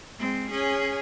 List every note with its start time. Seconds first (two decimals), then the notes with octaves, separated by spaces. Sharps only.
0.19 G#3 C4
0.51 C#4 G#4